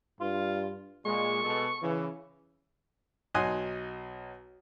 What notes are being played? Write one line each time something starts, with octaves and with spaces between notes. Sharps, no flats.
G2 F4
A#2 G#3 C#6
B2 G#3 A4
C#3 E3
B1 D#4 G#5 C6 D#6 F#6